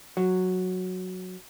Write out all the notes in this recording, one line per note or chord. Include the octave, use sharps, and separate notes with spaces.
F#3